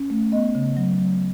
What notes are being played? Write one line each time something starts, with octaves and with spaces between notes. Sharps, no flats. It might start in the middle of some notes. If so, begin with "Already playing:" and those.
Already playing: C#4
A3
B3 D#5
C#3
F#3
F#3